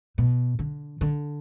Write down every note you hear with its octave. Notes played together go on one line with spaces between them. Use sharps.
B2
D3
D3